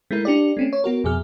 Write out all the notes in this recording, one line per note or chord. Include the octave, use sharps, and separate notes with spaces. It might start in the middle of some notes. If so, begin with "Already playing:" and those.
G#3 A3 E4 A#4
D4 G4 D5
A3 C4 C#4
C#5
B3 F#4 A#4
F2 B2 G#4 F6